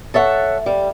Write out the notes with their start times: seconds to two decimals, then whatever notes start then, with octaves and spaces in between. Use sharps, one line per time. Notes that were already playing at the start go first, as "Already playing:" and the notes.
0.14 A4 C#5 E5 F#5
0.66 G3